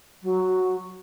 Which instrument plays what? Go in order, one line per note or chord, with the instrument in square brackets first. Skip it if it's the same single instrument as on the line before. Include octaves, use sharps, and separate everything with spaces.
[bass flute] F#3